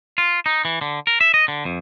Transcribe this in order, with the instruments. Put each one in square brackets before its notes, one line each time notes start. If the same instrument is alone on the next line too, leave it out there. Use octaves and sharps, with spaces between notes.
[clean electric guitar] F4
D#4
E3
D3
A#4
E5
D#5
D3
F2